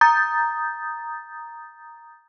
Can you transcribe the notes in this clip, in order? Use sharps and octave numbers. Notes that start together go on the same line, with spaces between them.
A#5 D#6 G6 A6